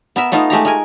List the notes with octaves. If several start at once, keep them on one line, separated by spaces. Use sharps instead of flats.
B3 A#4 E5
A3 B3 D#4 F4
G#3 A3 G4 A#5
G#3 A#4 G#5